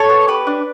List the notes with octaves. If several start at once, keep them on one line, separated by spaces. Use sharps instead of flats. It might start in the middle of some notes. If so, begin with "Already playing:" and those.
Already playing: A4 C#5
B3
G4 B4
D4